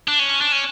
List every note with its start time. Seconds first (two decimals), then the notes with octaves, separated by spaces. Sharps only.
0.08 D4
0.19 C#4
0.41 D4
0.52 C#4